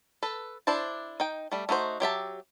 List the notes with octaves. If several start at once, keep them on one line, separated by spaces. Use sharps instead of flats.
A4 B4
D4 E4 C5 A5
D#4 G5
G3 A3
A3 D#4 F#4 C5
F#3 G4 E5 A5